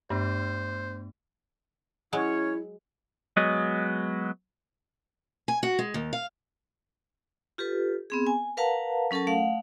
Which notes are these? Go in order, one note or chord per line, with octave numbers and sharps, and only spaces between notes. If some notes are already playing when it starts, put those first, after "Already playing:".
G2 A3 B3 D4 C5
F#3 G#3 C#4 E4 C#5
F#3 G#3 B3 D#5
G#5
F#4
G#3
D#2
F5
F4 G4 A4 B4
B3 C4 G#4
G#5
A#4 B4 F5 F#5 A5 A#5
F#3 C#4 A4 A#4 A5
A3 F5 F#5